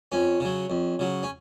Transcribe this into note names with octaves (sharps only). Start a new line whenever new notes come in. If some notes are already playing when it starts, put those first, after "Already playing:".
F2 C#4
C#3 F#3
F2
C#3 F#3
C#4